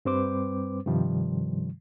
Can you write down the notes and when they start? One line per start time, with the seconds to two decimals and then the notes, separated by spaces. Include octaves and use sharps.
0.05 G2 G3 C4 B4 C5 D6
0.86 G2 C3 D#3 F3 G3